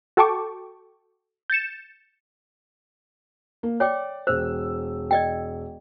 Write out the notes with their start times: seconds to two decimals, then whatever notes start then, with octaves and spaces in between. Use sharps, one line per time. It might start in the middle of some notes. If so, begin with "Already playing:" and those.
0.17 F#4 A4 G5 A5 C#6 D6
1.50 G6 A6 C#7 E7
3.63 A#3
3.80 C#5 D5 G5 D6
4.27 E1 C5 E6
5.11 D5 D#5 G5